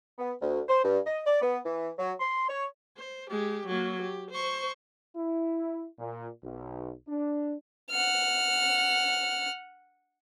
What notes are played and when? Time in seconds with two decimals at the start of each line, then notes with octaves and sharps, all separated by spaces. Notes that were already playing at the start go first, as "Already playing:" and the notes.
0.19 B3
0.41 D2
0.68 C5
0.83 G2
1.06 D#5
1.25 D5
1.42 B3
1.64 E3
1.98 F#3
2.20 C6
2.48 C#5
2.97 C5
3.30 G#3 G4
3.67 F#3 A#3
4.02 G4
4.31 C5 C#6
5.16 E4
5.99 A#2
6.43 B1
7.08 D4
7.91 F#5 F6